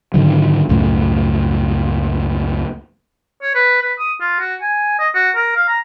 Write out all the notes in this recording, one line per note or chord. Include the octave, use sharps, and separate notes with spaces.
G#2 D3 D#3 F#3
C#2 F#2 A2
C#5
B4
B4
D#6
F4
F#4
G#5
D#5
F#4
A#4
F5
A#5